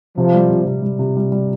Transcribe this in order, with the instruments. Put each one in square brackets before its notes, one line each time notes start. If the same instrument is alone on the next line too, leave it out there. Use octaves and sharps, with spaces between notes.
[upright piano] C3 [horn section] F3
[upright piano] G3
C3
C3
G3
C3
G3
G3